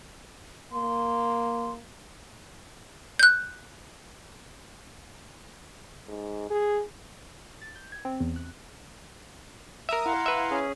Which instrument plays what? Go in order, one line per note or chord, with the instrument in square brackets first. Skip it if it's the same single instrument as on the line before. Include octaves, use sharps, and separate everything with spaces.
[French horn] A#3 [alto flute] C6
[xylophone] F#6 G6
[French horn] G#2
G#4
[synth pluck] A6
G6
G#6
C4
E2
F#6
[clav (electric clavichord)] A#4 E5 [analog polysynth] A#5 D#6
[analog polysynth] E4 F5 [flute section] F#5 A#5 C6
[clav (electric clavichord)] B4 E5
[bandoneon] C#4 G#4